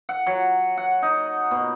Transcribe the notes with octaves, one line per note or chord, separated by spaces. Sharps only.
F#5
F#3
F#5
D#4
B2